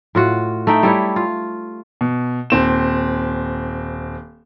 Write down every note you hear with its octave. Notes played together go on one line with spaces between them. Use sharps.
A2 F4 F#4
A3 D#4 E5 G5
G3 E4 C#5
F4
B2
D#1 C4 E7